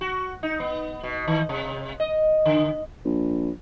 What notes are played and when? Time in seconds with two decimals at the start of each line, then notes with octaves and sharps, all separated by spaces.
0.01 F#4
0.43 D#4
0.60 B3
1.03 B2
1.27 D#3
1.49 C3
2.00 D#5
2.46 D3
3.05 A#1